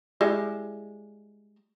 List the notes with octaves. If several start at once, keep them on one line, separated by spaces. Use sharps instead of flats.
G3 G#3 E4